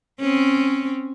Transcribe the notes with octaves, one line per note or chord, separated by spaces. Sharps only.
C4 C#4